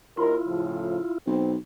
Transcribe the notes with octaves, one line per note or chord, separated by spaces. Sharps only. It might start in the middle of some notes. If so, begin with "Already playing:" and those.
D#2 E4 F4 A#4
A2 C#3 F3
B1 C4